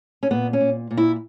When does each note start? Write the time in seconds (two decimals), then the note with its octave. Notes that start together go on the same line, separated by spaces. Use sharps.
0.23 C#4
0.31 A#2 B3
0.53 C#4
0.61 A#2
0.91 A#2
0.97 E4